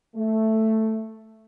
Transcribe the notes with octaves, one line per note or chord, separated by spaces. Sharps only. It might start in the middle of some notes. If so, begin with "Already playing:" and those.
A3